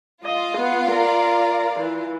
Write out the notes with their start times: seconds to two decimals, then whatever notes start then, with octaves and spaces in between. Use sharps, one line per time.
0.25 F4 D#5 F5
0.58 B3
0.88 A#4 D5
1.80 E3